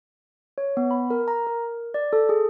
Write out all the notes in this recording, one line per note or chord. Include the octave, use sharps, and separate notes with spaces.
C#5
B3
B5
A#4
A#5
A#4
D5
A4
G#4